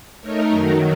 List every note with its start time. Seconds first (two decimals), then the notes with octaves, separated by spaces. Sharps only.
0.21 A3 D#4 A#4 C#5
0.50 F#2 D#3 F#3